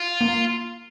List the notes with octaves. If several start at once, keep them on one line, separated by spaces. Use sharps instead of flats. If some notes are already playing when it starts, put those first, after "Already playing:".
Already playing: F4
A#3